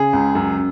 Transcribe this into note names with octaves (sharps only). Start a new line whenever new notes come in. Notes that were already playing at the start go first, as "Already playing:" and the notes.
Already playing: C#3 G#4
C#2
F#2